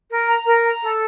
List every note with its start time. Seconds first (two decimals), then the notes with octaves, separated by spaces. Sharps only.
0.10 A#4
0.28 A#5
0.46 A#4
0.65 A#5
0.83 A4